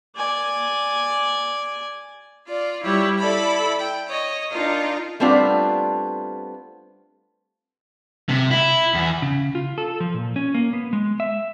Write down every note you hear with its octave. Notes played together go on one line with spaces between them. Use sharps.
D5 G#5
F4 D5
G3 E4 G4 C#5
E4 A4 D5 B5
G5
C#5 D#5
D4 D#4 F4 A#4
G3 A3 B3 C4 D4 F4
C3
E4
E2
C#3
F4
A4
F3
A#2
C#4
A#3
B3
G#3
E5